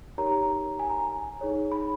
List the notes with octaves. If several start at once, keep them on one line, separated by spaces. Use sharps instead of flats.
D#4 G4 A#4 C#5 A#5
G#5
A#5
G#5
D#4 G#4 C#5
B5